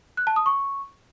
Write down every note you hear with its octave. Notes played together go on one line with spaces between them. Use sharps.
F#6
A5
D#6
C#6